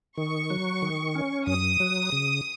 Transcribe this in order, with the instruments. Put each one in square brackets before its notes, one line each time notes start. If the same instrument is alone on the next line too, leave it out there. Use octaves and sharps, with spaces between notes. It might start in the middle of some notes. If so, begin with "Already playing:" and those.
[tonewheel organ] D#3 [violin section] C#6
[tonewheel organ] F#3
D#3
C#4
[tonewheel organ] F#2 [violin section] D#6
[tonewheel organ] F#3
C#3